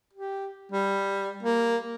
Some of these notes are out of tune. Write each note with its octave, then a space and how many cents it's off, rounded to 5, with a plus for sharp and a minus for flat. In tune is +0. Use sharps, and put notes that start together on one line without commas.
G4 -5
G3 +5
A#3 -5